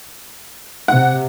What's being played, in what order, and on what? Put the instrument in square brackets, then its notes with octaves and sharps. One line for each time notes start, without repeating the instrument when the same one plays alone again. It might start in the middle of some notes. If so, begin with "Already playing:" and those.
[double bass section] C3 [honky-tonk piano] F#5